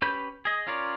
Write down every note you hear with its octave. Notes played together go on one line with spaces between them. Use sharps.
C#4 G4 B4 B5 G6
G#4 D#5
C#4 F4 A#4 C#5 D5